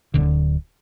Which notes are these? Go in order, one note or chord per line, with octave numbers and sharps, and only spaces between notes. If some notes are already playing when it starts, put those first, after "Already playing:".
D1 D3